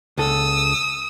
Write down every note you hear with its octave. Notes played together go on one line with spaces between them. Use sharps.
C#2 A4 D#6 E6